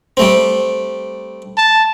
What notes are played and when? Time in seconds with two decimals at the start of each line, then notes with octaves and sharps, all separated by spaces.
0.17 G3 A3 C4
1.58 A5